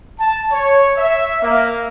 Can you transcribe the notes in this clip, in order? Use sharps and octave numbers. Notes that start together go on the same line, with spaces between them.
A5
C#5
E5
A#3